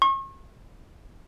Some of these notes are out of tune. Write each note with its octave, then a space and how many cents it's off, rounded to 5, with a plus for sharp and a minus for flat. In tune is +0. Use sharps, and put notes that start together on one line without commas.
C#6 -40